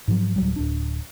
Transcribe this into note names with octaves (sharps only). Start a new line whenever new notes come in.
G#2 F3 F#3
D1 F#3 G3
D1 D4